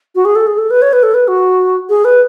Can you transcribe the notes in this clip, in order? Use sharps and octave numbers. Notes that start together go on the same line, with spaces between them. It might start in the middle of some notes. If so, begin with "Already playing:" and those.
F#4
G#4
A4
G#4
A4
B4
C#5
B4
A4
B4
F#4
G#4
B4